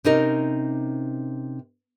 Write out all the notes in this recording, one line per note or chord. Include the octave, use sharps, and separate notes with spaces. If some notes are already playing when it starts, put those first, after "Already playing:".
C3 C#4 D#4 A#4